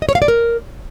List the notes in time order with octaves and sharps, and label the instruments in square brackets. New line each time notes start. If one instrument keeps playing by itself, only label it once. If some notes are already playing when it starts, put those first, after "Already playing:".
[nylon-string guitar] D#5
C#5
F5
D5
A#4